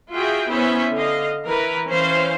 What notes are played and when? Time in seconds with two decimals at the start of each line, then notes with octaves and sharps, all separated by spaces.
0.12 F4 F#4 G#4 E5 G5
0.49 B3 C#4 E4 C5 E5
0.94 D3 D#5 F5
1.44 E3 A#4 B4
1.88 E3 C#4 C5 F5